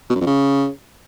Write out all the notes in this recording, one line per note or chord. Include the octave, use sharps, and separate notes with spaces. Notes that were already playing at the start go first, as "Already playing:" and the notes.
B2
F#2
F2
C#3